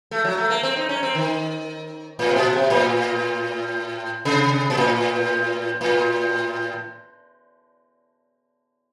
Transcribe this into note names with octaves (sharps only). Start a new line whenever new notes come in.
A3
F#3
A3
A#3
C4
D#4
C#4
C4
D#3
A2
C3
A#2
C3
A2
C3
A#2
A2
A2